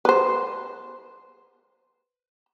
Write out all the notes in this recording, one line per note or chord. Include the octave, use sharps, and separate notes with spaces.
B4 C5